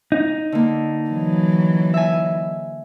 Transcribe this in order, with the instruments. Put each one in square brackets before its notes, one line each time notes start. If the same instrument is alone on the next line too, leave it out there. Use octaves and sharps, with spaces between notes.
[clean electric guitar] D#4
[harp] D3 A#3
[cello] E3 F#3
[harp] E5 G#5